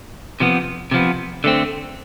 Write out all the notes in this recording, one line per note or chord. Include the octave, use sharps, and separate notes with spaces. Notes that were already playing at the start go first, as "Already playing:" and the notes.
C3 F3 B3
C3 F3 B3
D3 A3 C4